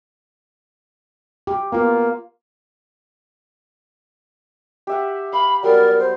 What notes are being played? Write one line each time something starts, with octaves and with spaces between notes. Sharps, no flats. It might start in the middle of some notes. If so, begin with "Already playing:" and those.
G4
A#3 B3 F4
G4 E5 F#5
F5 B5
F#3 G3 B3 A#4 D5
C5 C6